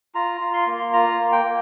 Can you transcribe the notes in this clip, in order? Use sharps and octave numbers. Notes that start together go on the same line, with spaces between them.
F4 A#5
F4
C6
A#3
F4 A#5
A#3
G5
A#3